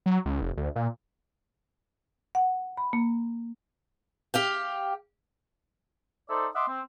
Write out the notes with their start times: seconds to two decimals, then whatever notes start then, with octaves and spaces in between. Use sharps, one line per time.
0.06 F#3
0.26 C#2
0.42 F1
0.57 D2
0.76 A#2
2.35 F#5
2.77 B5
2.93 A#3
4.34 G4 F5 G5
6.30 D#4 A4 C5 D5 E5
6.55 D#5 E5 F#5 C6 D6
6.68 C4